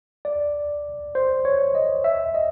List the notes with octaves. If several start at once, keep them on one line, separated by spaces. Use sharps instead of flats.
D5
C5
C#5
D#5
E5
D#5